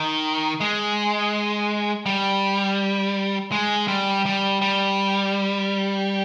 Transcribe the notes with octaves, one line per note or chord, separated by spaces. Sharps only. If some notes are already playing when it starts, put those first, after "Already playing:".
Already playing: D#3
G#3
G3
G#3
G3
G3
G3